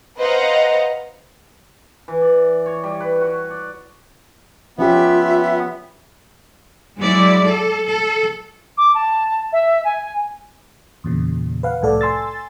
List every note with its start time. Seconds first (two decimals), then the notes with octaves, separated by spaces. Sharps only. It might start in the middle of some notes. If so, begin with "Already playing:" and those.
0.17 B4 C5 D#5 F5 F#5 A#5
2.08 E3
2.21 D5
2.66 C#5
2.84 G3
3.00 B4
3.21 F#4
3.50 D5
4.78 F3 B3 C#4 F4 G4 E5
6.99 F#3 G#3 E4 D5
7.47 A4
7.86 A4
8.77 D6
8.94 A5
9.52 E5
9.84 G#5
11.04 E2 A#2 C#3
11.63 B4 F5 F#5
11.81 C2 F2 A2 A4 D5
12.01 G#5 C6 E6 A6